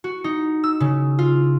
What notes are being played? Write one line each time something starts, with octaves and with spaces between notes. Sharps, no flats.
F#4
D#4
E6
C#3
F4